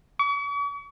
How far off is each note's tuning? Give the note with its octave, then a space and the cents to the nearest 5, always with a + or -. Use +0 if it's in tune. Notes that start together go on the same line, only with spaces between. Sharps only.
C#6 +45